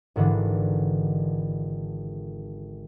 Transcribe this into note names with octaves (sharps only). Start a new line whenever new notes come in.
G#1 G#2 D3 E3 D4